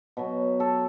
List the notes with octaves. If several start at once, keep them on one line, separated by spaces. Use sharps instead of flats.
B2 F#3
A4